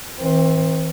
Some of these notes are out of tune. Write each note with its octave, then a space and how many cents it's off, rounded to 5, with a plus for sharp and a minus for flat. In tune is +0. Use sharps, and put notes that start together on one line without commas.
E3 -35 C4 +15